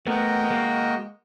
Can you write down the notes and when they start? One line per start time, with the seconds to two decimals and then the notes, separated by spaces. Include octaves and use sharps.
0.07 A3 B3 F#4 A#4 D#5 G5
0.44 B3
0.50 G#3 A#3